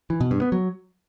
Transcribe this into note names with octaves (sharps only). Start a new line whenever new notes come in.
E3
B2
G2
B3
F#3